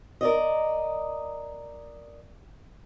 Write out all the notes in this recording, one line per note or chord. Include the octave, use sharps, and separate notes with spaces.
A#4 D5 D#5